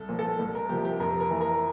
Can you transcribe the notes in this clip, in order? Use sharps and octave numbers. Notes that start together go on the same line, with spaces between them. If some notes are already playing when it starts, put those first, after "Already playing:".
Already playing: C2 A4
A#2 F3
A4
C2
A#4
C3 F3 G4
G4
F2 A#4
A#4
E3
A#4